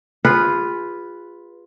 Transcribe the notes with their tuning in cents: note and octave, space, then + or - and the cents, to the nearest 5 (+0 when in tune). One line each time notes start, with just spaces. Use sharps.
F4 +0 G#4 -30 B4 +0